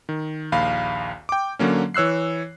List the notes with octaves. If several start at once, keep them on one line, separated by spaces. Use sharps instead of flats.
D#3
A#1 D#2 F5 B5
G5 D6
D3 F#3 A#3 C#4
E3 C#5 E6 F#6 C7